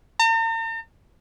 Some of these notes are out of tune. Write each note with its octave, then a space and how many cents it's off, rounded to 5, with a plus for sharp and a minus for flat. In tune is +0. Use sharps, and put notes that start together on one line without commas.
A#5 -45